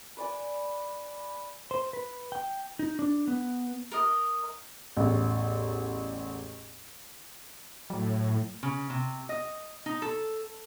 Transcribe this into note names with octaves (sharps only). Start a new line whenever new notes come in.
B4 D5 G#5
C5
B4
G5
D#4
D4
B3
A#4 D#5
A1 E2
A2 F#3
C#3
C3
D#5
D#4
A4